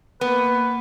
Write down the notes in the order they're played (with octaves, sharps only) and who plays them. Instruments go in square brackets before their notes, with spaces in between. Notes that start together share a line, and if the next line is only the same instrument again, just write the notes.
[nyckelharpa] A#3 [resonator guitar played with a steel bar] B3 [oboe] B4